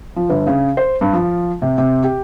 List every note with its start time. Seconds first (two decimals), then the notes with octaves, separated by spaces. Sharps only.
0.16 F3
0.29 G1
0.47 C#3
0.77 C5
1.01 G2
1.13 F3
1.62 C3
1.78 C3
2.04 G4